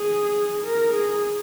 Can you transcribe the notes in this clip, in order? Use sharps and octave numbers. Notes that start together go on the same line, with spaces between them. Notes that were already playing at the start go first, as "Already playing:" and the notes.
Already playing: G#4
A#4
G#4